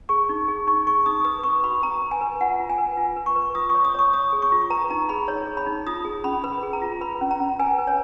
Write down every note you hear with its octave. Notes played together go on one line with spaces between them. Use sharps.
G#4 C#6
D#4
G#4
D#4 C#6
G#4 C#6
D#4 D#6
B4 D#6
B4 C#6
F#4 B5
B4 A#5
B4
G#5
B4
F4 F#5
F4
G#5
B4
F4
B4
C#6
B4
F4 D#6
C#6
C#5
D#6
C#5 C#6
C#5 D#6
G#4
C#6
F4
B4 A#5
D#4 A#5
G#4 B5
D#4 C#5
G#4
B5
D#4
F4 D#6
G#4
C#4 B5
B4 B5
G#4
A#5
F4
B4 B5
C#4
A#5
C#4
B4 G#5
B4
C#5